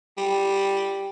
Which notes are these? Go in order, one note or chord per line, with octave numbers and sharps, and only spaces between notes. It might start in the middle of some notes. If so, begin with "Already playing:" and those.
G3